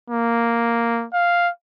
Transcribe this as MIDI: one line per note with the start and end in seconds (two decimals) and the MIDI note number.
0.10 1.06 58
1.14 1.50 77